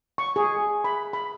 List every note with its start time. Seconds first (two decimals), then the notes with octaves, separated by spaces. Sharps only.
0.18 C#6
0.36 G#4
0.84 B5
1.13 B5